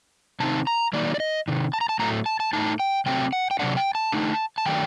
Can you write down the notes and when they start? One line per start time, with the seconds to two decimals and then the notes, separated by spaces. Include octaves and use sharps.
0.40 C3 D#3 A3 C4 D#4 A5
0.67 A#5
0.93 D#3 F#3 A#3 D#4 D5
1.14 D5
1.20 D#5
1.48 C3 D#3
1.74 A5
1.81 A#5
1.89 A5
1.99 A2 F#3 A3 A#5
2.26 A5
2.40 A5
2.53 A2 A3 D#4 A5
2.80 G5
3.06 C3 F#3 A3 C4 G5
3.33 F#5
3.51 G5
3.59 C3 F#3 A#3 D4 F#5
3.77 G5
3.95 A5
4.12 D3 A3 D#4
4.58 A5
4.66 D#3 F#3 A3 D4 G5